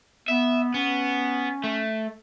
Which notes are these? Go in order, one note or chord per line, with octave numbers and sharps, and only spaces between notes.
B3 E5
B3 C#4
A3